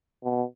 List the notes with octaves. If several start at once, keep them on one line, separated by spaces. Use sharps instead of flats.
B2